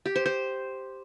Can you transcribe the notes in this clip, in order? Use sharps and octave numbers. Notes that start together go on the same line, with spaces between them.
G4
C5
C5